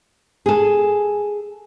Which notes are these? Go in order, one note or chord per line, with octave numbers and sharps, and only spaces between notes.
G#4 A4